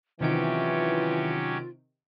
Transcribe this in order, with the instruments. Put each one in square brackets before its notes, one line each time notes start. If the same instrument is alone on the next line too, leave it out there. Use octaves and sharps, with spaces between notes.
[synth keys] C3 D#3 D7 [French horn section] E3 [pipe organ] F#3 C#4 G4 [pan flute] F4